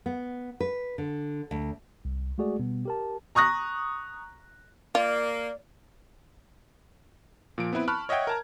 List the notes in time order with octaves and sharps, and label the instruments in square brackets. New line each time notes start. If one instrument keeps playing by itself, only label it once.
[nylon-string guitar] B3
B4
D3
D2
[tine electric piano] C2
G#3 A3 F#4 G#4 D5
B2 G3 B3
G4 A#4 A5
[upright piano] A#5 C#6 D#6 F#6 A#6
[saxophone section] A#3 [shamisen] F4 [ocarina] D5
[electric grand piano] A#2 F3 D7
B3 C4 E4 B4
A5 B5 C#6 F6 F#6
C#5 D#5 E5 F#5 G5 G#6
A#4 A5 A#5